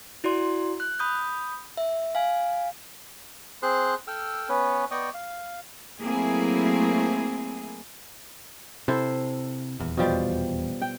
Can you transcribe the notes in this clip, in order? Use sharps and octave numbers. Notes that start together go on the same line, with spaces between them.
E4 F#4 D5 C6
F#6
B5 D#6 G6
E5
F5 G#5
C4 G#4 C5 C6 F#6
A4 G5 E6 F6
B3 C#4 B4 C#5
B3 D5 D#5 G5 C#6 D#6
F5
F#3 A3 A#3 C4 E4 G#4
C3 E4 A4 C5
D#1 E2
B2 F3 G3
G5